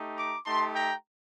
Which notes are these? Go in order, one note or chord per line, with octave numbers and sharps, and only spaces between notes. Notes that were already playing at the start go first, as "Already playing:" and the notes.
Already playing: A3 D#4 G4
A#5 D6
A3 D#4 G4 A5 C6
G5 A#5